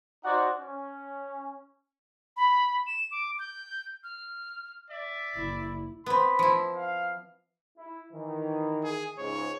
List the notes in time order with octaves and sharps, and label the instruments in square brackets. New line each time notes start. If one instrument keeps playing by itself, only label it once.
[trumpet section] D#4 F#4 C5 D5 F#5
C#4
[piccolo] B5
E7
D6
G6
F6
[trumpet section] D5 E5
[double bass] F#1 E4
[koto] B3 C4 [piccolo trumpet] B5
[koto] F3 E4
[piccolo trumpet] F5
[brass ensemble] E4
D#3 E3
[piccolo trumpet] G#4
[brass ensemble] C#2 G#2 [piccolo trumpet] C#5